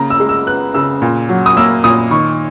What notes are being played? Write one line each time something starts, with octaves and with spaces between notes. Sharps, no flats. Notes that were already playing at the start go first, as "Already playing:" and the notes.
Already playing: C#3 A#3 A#5
E6
G#3
E6
B3 F#6
C#3 E6
A#2
F#3
D#6
A#3 E6
A#2 D#6
D#3 C#6